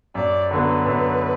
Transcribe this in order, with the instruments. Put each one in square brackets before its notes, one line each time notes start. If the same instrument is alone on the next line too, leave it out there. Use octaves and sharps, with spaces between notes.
[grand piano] F#2 [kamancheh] D5
[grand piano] D3 F#3 B3 [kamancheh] B4
[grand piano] F#2